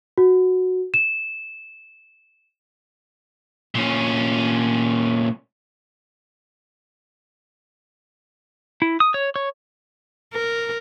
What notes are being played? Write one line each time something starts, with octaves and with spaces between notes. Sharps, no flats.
F#4
E7
A#2 C#4
E4
D#6
C#5
C#5
A#4